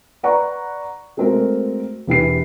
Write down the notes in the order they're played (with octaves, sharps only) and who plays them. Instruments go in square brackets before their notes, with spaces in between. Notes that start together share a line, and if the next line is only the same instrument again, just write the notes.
[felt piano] B4 D5 F#5 A#5 C#6
G#3 A3 C4 F#4 A#4
E1 E3 G4 B4 C7